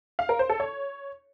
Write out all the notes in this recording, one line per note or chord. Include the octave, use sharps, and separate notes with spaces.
F5
A#4
C5
A4
C#5